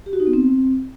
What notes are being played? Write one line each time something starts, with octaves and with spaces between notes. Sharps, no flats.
G4
F#4
D#4
B3
C4